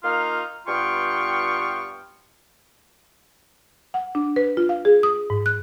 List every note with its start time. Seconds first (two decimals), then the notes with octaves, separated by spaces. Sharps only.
0.03 A#3 D#4 F4 F5
0.67 G2 B3 F4 G5 C#6
3.94 F#5
4.15 D4
4.36 B4
4.57 F4
4.69 F5
4.85 G#4
5.03 D#6
5.30 G#2
5.46 F#6